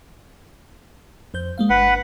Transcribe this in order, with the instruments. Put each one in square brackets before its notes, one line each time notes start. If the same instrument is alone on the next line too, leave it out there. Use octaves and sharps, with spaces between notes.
[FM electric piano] F2 C5 G6
G#3 A#3 F5
[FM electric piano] G1 [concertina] B4 F#5